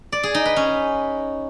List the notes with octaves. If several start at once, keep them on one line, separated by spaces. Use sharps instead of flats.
D5
G#4
D#4
B4
C#4